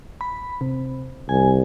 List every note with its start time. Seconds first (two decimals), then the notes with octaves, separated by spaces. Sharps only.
0.21 B5
0.61 C3
1.29 C2 G#5